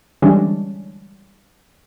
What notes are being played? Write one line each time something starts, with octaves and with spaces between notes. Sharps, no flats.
D3 E3 G3 G#3 C#4 D4